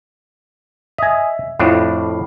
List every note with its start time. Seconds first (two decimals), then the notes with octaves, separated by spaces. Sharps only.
0.98 D#5 E5 G#5
1.59 F2 A2 D4 E4 F5